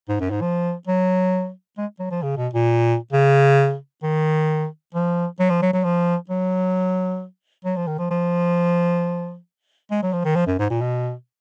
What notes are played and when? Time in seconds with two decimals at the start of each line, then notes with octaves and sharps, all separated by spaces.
0.09 G#2
0.20 F#2
0.30 G#2
0.42 F3
0.87 F#3
1.78 G#3
2.00 F#3
2.11 F3
2.23 C#3
2.37 B2
2.54 A#2
3.13 C#3
4.03 D#3
4.95 F3
5.40 F#3
5.50 F3
5.62 F#3
5.73 F#3
5.84 F3
6.30 F#3
7.65 F#3
7.76 F3
7.87 D#3
7.99 F3
8.11 F3
9.91 G#3
10.03 F#3
10.13 F3
10.25 D#3
10.35 F3
10.47 F#2
10.59 G#2
10.70 A#2
10.81 B2